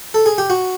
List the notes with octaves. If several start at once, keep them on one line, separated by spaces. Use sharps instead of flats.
A4
G#4
G4
F#4